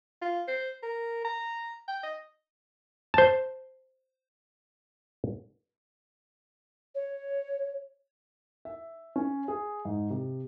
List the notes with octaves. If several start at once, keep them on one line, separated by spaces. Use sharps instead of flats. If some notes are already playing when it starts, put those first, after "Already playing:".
F4
C5
A#4
A#5
G5
D#5
C5 A5
C#5
E5
C#4
G#4
G#2
C3